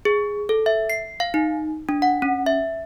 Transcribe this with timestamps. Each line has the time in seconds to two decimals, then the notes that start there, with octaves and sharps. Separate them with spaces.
0.05 G#4
0.49 A4
0.66 E5
0.90 C7
1.20 F5
1.34 D#4
1.89 D4
2.02 F#5
2.22 C#4
2.46 E5